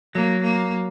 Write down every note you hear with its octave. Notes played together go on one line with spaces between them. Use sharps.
F#3 A#3
A#3